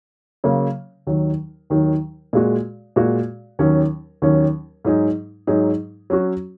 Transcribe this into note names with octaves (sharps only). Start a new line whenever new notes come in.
C#3 F#3 A#3
D#2 D#3 F#3
D#2 D#3 F#3
A#2 G#3 F#4
A#2 G#3 F#4
D#2 D#3 F#3 C#4
D#2 D#3 F#3 C#4
G#2 F#3 D#4 G#4
G#2 F#3 D#4 G#4
F#3 C#4 F#4